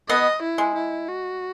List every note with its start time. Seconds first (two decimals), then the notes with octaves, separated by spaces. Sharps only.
0.09 B2 B3 D#5
0.42 E4
0.58 G#3
0.75 E4
1.08 F#4